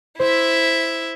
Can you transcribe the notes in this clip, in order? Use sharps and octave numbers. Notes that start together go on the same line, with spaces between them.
E4 C5 E5